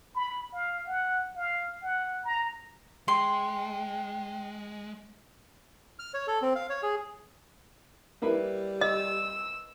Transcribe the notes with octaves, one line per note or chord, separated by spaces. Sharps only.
B5
F5
F#5
F5
F#5
A#5
G#3 G5 C6
F6
C#5
A4
C4
F5
C#5
G#4
G3 A#3 E4 B4
D#5 E6